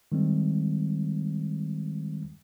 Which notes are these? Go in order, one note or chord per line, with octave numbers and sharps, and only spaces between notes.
D#3 G3 G#3 C4